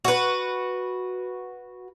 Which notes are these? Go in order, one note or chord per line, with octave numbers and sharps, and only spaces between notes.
F#4 B4